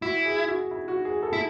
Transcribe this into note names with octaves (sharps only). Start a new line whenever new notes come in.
E4 F#4
G#4
F#4
E4
F#4
G#4
A4
E4